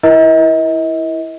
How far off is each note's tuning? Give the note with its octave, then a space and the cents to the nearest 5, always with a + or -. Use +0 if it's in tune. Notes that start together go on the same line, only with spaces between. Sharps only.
E4 +0 A#4 +35 D#5 +40